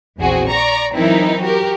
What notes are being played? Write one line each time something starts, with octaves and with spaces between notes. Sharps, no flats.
A#1 E2 C4 F#4 G#4
D5 A#5 C#6 A#6
E3 F#3 C4 D#4 E4 A#4
F#4 G4 A#4